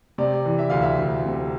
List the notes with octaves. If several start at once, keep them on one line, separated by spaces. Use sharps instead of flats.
C3 D5
E3
E5
D2 F5
E5
D2
C3